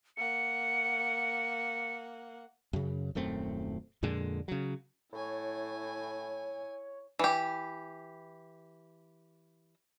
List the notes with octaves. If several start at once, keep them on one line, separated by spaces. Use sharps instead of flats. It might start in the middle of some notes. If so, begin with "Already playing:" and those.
A#3 F#5 C#7
F#2 C#3
D#1 F#2 A3 C4
F2 A#2 D3 G#3
C#3 F#3
A2 E4 C#5 G#5
E3 G4